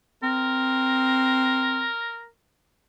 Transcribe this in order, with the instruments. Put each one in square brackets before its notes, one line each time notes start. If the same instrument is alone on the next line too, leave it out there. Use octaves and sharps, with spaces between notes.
[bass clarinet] C4 [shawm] A#4